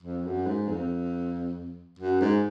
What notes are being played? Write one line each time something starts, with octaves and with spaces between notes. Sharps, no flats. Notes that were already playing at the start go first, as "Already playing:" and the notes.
F2
F#2
G#2
F2
F#2
G#2